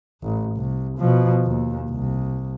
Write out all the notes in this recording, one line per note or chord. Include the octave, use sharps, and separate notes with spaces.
A1
C2
B2 F3
D#2
C2